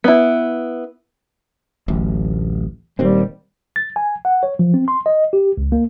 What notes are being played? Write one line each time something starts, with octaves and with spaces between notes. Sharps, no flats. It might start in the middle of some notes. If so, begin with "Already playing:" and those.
B3 E4
D1 A1
D#1 D#2 G3 C4
A6
G#5
F#5
C#5
F3
C4
C6
D#5
G4
C#2
A#3